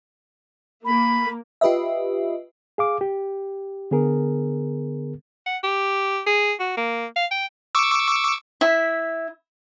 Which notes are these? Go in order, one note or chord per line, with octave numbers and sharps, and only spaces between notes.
A#3 B5
F4 G4 B4 D#5 E5
G#4 F5 D6
G4
D3 B3 G#4 A#4
F#5
G4
G#4
F#4
A#3
F5
G5
C#6 D6 E6
E4 E5